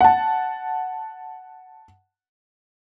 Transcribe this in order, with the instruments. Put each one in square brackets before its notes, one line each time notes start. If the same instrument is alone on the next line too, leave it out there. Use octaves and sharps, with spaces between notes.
[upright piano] F#5 A5